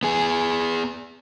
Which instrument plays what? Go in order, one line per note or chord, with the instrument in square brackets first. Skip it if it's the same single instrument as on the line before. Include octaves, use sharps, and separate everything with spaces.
[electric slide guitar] B3 G#4